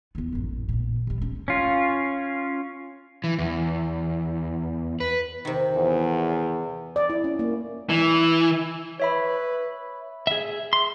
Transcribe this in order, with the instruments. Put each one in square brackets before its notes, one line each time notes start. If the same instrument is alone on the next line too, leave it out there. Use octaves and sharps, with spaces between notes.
[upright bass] E2 B3
A1 F#2
A#1 A#2
C3 G3
C#4
[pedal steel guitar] C#4 F4
[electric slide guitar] E3
E2
B4
[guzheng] C3 D#3
[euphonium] E2
[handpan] D5
E4
C#4
A#3
[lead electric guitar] E3
[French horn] B4 [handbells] C#5 E5 B5
[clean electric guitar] G#4 E5
C6